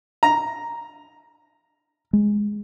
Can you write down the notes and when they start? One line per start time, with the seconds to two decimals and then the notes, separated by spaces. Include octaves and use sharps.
0.23 A#5
2.13 G#3